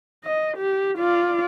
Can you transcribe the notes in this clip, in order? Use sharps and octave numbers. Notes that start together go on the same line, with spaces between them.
D#5
G4
F4 D5